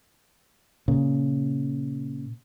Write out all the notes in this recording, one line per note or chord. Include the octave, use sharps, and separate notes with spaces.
A#2 C#3